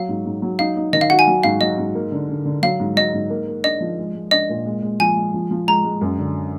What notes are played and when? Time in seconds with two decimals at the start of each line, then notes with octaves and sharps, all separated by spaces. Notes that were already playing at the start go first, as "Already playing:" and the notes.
Already playing: F#3 F5
0.09 G#2
0.25 G#2
0.42 F#3
0.59 D#4 F5
0.77 D#4
0.93 D#3 D#5
1.01 F5
1.10 F#4 F#5
1.19 G#5
1.27 F#3
1.43 G#2 F5
1.61 F#3 D#5
1.78 G#2
1.95 A#3
2.12 D3
2.29 D3
2.45 D3
2.62 F#3 F5
2.80 G#2
2.96 F#3 D#5
3.14 G#2
3.30 A#3
3.48 A#3
3.64 D4 D#5
3.81 F3
3.99 G#3
4.15 G#3
4.31 D4 D#5
4.49 A#2
4.66 G#3
4.83 G#3
5.00 F3 G#5
5.16 G#3
5.34 F3
5.51 F3
5.67 G#3 A#5
5.84 G#3
6.01 F#2
6.18 D3